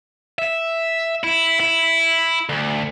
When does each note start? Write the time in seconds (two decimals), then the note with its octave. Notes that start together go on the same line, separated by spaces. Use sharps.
0.39 E5
1.24 E4
1.60 E4
2.49 D2